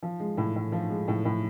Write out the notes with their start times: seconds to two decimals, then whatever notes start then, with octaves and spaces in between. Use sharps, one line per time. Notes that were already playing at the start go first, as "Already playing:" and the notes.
0.02 F3
0.20 G#3
0.37 A2
0.56 A2
0.72 F3
0.90 G#3
1.08 A2
1.25 A2